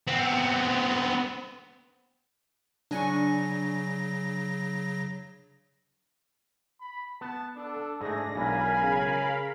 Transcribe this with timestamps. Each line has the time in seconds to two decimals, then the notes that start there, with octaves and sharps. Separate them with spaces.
0.08 B3 C4
2.91 C#3 F#3 D4 G#5 C#6 A#6
6.80 B5
7.21 B3 A5
7.56 D4 A4
8.01 G#2 A3 D4 G#4 A#6
8.36 B1 E3 G#3 A#4 F5 G#5 B5
8.81 C#3